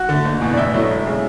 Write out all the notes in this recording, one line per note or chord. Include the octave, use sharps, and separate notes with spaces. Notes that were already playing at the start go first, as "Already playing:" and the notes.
Already playing: F#4 F#5
D3 A3
F#1
E2 B2
D5
A1 E4 E5
A2 F#3 A3
E1
C#3